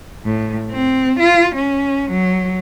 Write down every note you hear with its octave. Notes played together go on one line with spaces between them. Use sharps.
A2
C4
F4
C#4
F#3